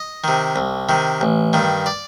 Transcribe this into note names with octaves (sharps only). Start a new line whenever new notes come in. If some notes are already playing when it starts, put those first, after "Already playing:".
Already playing: D#5
C3 D#3
C2
C3 D#3
A1
G2 D#3
D5